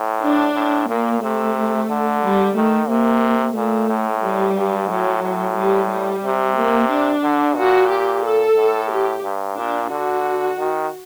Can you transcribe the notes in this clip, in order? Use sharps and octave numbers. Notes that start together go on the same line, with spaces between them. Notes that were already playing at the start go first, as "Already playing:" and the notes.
Already playing: A2
D4
A2
A#2 A#3
C3 A3
D3
G3
D#3 A3
C3 A#3
A#2 A3
A2
G3
G2
A2 F#3
A2
G3
G3
C3
A#3
D4
D3
A#2 F#4
G4
A4
A2
G4
G2
A#2 D4
D3 F#4
D#3